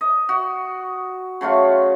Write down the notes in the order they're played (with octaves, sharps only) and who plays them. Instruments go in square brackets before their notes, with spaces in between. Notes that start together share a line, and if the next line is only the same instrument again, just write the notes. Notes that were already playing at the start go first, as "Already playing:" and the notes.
[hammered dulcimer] D#5
F#4
C#3 F#3 A3 F4